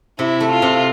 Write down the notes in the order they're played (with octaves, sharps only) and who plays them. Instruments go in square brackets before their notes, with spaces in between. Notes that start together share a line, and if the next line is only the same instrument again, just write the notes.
[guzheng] C3 [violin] E4
[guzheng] A3
[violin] F4
[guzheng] C3